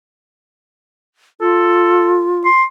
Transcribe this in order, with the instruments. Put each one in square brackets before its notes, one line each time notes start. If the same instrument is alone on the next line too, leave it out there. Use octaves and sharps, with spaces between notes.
[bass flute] F4 [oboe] A4
[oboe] C6